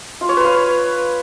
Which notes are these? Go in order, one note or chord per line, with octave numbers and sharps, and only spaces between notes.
F4
C#5
B4
F5